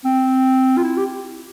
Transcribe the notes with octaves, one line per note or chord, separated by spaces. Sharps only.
C4
F4
E4
G4